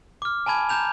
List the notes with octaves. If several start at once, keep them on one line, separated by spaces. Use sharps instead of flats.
D6 F6
G#5 A5 B5 G#6
A#5 G6 F7